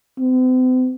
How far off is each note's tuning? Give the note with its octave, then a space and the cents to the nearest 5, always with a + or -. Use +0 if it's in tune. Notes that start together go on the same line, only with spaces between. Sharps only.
C4 -45